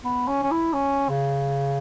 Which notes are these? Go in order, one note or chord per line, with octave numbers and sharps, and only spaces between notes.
B3
C#4
C#4
E4
C#4
C#3